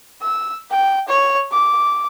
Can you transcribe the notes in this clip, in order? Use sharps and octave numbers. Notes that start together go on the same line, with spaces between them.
E6
G5
C#5
D6